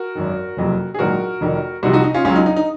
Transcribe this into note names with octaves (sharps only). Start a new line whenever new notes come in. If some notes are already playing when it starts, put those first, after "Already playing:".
Already playing: F#4 A#4
G#1 F#2 D#3
F#1 F2 C3 F#3
G#4
A#1 G#2 D#3 F#3 F#4 A#4
F1 F2 D#3
C2 C3 F3 D#4 F#4
D#4 F#4
D#4
C#4 F4
C#2 C#3 F#3 C#4 F4
D#4
D#4
D#4